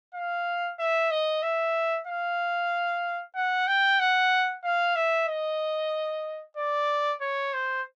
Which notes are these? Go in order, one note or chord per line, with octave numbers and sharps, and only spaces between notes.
F5
E5
D#5
E5
F5
F#5
G5
F#5
F5
E5
D#5
D5
C#5
C5